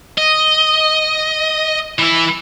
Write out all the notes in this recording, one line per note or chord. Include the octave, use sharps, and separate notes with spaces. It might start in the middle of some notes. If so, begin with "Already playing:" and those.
D#5
E3 E4